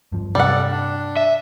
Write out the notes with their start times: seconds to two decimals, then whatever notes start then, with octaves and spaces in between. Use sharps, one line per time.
0.12 G2 F3
0.35 G2 C3 G3 A4 D5 F#5
0.71 D4
1.17 E5